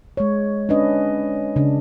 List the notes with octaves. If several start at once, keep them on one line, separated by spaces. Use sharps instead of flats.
G#3 C#5
C#4 D4 B4 D#5
C#3 D4